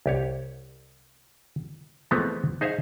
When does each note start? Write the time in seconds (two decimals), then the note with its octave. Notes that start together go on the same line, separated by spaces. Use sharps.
0.06 C2 G4 C#5
2.11 E3 F3 G#3 A3 B3 C4
2.61 D#4 G#4 C5 E5 F5